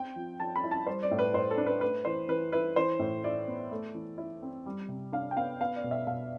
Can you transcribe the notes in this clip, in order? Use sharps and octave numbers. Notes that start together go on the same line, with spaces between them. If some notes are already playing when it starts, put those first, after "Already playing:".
Already playing: C4 G5
F3
F3 A5
B5
E4
A5
G3 C5
D5
A2
B4
A2 C5
A4
D4
B4
A3 B4
E3 C5
E3 B4
E4 B4
E3 C5
A2
E4 D5
B3
A3
E3
E4
C4
G3
C3
D4 F5
G5
B3 F5
B3 F5
D5
B2
E5
B2 F5